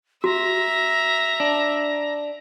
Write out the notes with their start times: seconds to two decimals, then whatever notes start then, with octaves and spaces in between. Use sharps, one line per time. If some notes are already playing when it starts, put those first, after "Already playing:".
0.24 F#4 E5 A#5
1.40 D4